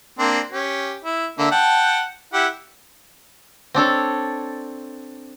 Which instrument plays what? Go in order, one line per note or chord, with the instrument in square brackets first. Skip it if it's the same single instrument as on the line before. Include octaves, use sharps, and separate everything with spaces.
[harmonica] A#3 C4 D4
C#4 G4
E4
D3 A#3 E5
F#5 G5 A5
E4 G4 F#5
[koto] C4 D4 A4 C#5